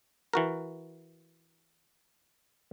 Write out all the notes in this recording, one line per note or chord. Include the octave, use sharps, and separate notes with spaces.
E3 F#4 A#4